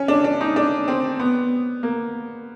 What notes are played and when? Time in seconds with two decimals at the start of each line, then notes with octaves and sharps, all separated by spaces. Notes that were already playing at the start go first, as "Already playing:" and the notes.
Already playing: C#4
0.08 D4
0.24 D4
0.41 D#4
0.56 D4
0.88 C4
1.20 B3
1.83 A#3